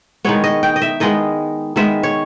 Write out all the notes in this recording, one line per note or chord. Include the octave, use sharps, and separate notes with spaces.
D#3 G#3 B3 C#5
D#5
G5
D#5
E5
D#3 G#3 B3 D#5
D#3 G#3 B3 E5
C#5